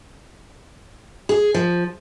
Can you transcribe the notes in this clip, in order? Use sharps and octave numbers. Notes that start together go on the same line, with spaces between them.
G#4
F3